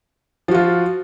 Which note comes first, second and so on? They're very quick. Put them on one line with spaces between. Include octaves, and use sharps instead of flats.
F3 F#4 F4